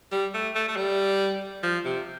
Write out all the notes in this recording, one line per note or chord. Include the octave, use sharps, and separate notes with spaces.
G3
A3
A3
A3
G3
F3
C3